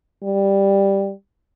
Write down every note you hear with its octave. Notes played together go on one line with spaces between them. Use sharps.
G3